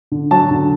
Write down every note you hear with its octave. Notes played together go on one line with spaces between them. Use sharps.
D3
F#3 A5
D3